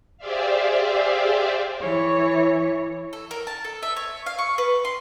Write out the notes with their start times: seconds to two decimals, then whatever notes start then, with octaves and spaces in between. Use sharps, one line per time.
0.18 G4 G#4 C5 D5 E5 F5
1.81 E3 C#5
3.13 A4
3.31 A#4
3.47 A5
3.65 A4
3.83 E5
3.96 C#5
4.26 F5
4.39 C#6
4.58 B4
4.85 C6